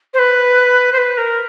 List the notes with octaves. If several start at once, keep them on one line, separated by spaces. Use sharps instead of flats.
C5
B4
C5
B4
A#4